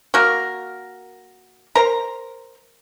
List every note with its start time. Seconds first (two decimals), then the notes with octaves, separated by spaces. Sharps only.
0.14 A#3 F#4 A#4
1.75 A#4 C5 A#5